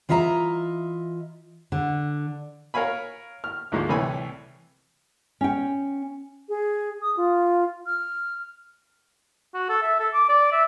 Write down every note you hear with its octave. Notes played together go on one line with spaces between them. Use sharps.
E3 F4 D#5 E5 A#5
D3
A#4 C#5 F5 G#5 B5
F6
D2 G#2 F3 G#3 A#3
C2 A2 E3 C#5 G#5 B5
C#4 G5
G#4
D#6
F4
F6
F#4
A4
E5
A4
D6
D5
E5